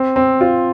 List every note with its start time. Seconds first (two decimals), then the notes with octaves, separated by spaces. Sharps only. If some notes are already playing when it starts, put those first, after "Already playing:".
Already playing: C4
0.16 C4
0.41 F4